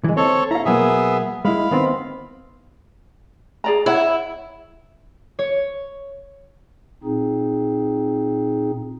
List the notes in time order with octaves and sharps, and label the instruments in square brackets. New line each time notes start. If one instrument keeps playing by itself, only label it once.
[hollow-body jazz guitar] E3 G#3
[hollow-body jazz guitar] C4 [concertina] A4 C#5
[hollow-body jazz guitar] E4 F5 [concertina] A#5
[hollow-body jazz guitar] B2 F#3 A#3 [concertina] B3 G#4 E5
[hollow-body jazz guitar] G#3 E4 [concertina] F5 B5
[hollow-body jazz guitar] D#3 B3 C4
[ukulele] G#4 D5 A#5
[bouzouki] E4 [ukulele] C#5 F#5
[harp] C#5
[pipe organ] A#2 C4 D#4 G#4